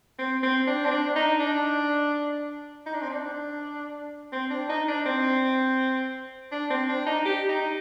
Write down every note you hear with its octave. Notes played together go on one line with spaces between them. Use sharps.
C4
C4
D4
C4
D4
D#4
D4
D#4
D4
C4
D4
C4
D4
D#4
D4
C4
D4
C4
D4
D#4
G4
D#4